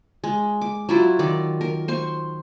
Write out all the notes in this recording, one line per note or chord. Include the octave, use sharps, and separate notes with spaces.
G#3
D6
F#3 E4 F4
D#3 D5
A#4
C5 C6 C#6